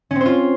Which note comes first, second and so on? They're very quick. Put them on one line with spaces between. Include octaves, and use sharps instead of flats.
C#4 C4 C5 F4